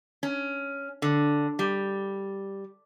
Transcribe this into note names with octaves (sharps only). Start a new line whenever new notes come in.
C#4
D3
G3